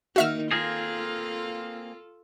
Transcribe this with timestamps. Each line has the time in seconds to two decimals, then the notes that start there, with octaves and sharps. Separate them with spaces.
0.16 D#3 A#3 D#4 F#4 E5 F6
0.51 A#3 C4 F4 G#4 A4